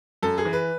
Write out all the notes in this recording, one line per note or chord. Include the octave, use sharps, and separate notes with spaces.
F#2 A4
G#4
E3
B4